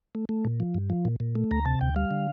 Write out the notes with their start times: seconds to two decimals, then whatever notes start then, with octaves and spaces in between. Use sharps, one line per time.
0.15 A3
0.29 A3
0.45 A#2
0.60 F3
0.74 G2
0.90 F3
1.05 A#2
1.20 A#2
1.35 A3
1.51 D2 A#5
1.66 C3 A5
1.81 D2 G5
1.96 G3 F5
2.11 D3